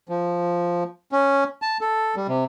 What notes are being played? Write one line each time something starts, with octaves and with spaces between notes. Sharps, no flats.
F3
C#4
A5
A4
G3
C3